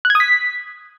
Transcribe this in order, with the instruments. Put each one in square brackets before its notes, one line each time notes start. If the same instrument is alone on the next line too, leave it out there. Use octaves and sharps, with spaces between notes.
[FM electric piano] F#6
G#6
D#6
B6